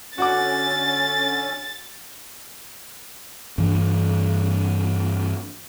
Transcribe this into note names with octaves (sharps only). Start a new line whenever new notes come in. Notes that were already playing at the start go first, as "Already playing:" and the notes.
D3 C#4 F#4 F#5 D6 A6
G2 E3 D4